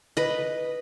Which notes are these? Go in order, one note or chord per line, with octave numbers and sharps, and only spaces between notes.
B4 D#5